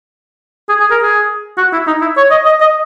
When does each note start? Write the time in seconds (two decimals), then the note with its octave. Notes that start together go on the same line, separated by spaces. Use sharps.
0.69 G#4
0.80 G#4
0.91 A#4
1.03 G#4
1.57 F#4
1.72 E4
1.87 D#4
2.01 E4
2.17 C#5
2.31 D#5
2.46 D#5
2.60 D#5